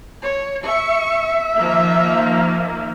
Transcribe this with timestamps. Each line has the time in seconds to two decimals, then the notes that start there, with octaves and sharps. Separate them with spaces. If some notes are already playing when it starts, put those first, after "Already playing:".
0.23 C#5
0.65 E5 C#6
1.57 D#3 F3 A#3